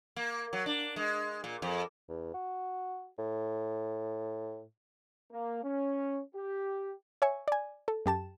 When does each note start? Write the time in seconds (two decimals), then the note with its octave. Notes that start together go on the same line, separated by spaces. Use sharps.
0.16 A#3
0.53 F#3
0.66 D4
0.96 G#3
1.44 A#2
1.62 F2
2.09 E2
2.34 F#4
3.18 A2
5.32 A#3
5.63 C#4
6.34 G4
7.22 C#5 E5 G#5 C#6
7.48 D5 G#5
7.88 A4
8.06 F#2 G4 A5 E7